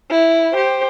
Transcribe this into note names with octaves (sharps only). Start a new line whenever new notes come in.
E4
G4 C5